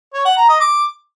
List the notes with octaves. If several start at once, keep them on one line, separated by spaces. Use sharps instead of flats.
C#5
F#5
A#5
D#5
D6